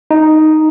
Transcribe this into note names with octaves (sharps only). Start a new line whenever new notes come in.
D#4